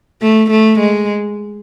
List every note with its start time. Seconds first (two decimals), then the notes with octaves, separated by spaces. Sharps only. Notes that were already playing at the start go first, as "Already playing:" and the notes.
0.22 A3
0.50 A3
0.80 G#3